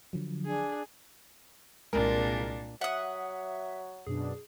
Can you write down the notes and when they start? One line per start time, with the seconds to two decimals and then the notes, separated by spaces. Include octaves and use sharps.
0.13 D3 F3 F#3
0.46 D4 G#4
1.93 C2 A#2 G#3 D4 A#4
2.81 F#3 E5 F#5 D#6
4.07 F#2 B2 D4 G#4